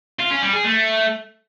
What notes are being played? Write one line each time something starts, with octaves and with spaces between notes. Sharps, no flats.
F4
C#4
G3
G#4
A3